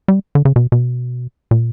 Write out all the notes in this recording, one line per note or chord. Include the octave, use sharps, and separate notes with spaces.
G3
D3
C#3
B2
B2
A#2